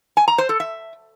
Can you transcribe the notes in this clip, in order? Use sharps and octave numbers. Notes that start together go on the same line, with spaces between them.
G#5
A#5
C5
A4
E5